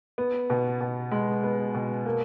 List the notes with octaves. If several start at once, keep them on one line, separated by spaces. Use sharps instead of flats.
B3
B2
B2
G#3
B3
B2
A#3